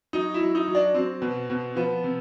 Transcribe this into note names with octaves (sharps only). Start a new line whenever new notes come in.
F#3 D#4
E4
F#3
D#4
F#3
D4
F#3 C4
B2
B2
F3 B3
C3